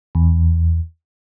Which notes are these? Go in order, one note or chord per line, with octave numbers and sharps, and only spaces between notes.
E2